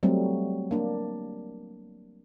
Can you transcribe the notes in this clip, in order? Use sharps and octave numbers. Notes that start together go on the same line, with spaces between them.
F#3 G3 A3 C4
A#3 D4